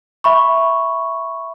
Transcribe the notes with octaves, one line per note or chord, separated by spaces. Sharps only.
E5 B5 C#6